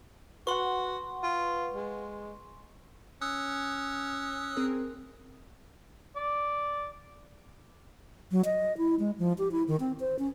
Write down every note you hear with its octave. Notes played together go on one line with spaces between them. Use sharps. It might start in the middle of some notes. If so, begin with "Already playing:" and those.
F#4 B4 F#5 C6 C#6
F4
G#3
C#4 D#6 E6 F#6
C4 G#4 A#4
D5
F#3
D#5
E4
G#3
F3
G4
E4
D#3
C4
C5
C#4